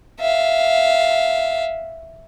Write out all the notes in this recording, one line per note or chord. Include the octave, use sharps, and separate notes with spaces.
E5 F5